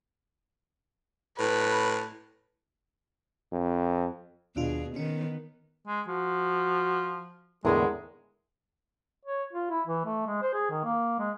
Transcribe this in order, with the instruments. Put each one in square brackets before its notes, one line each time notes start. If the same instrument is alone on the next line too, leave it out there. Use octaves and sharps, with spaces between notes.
[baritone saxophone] A2 [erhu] B4
[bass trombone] F2
[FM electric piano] D#2 D4 F4 [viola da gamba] B2 G#4
[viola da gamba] D#3 B3 [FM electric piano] C#4
[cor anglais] G#3
[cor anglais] F3 [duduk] F#4
[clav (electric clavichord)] E2 A2 D3 [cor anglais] G#3 [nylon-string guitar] B3 G#4 A#4
[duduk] C#5
F4
E4
E3
A3
G#3
C5
G#4
D#3
A#3
G#3